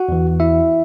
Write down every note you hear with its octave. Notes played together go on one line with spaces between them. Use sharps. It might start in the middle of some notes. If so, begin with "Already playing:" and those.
Already playing: F#4 F#5
E2 E3
E4 E5